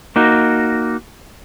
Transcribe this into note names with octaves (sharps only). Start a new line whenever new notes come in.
A#3 D#4 F#4